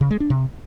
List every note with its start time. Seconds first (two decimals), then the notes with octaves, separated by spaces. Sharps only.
0.01 C#3
0.11 G#3
0.20 D4
0.30 C3